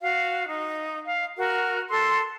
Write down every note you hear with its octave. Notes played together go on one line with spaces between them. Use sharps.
F#4 F5
D#4
F5
F#4 A#4
A4 C6 E6